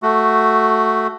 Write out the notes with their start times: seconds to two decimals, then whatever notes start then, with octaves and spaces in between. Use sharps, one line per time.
0.03 A3 F#4